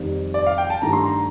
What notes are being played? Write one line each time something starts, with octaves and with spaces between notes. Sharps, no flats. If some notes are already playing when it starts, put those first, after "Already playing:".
Already playing: F2 D#3 G3
D5
F5
G5
A5
G2 D#3 A3 A#5
C6
A#5